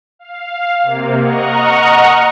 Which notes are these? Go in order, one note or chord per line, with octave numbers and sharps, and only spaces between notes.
F5
C3 A#3
D#5 F#5 A#5 C#6 F6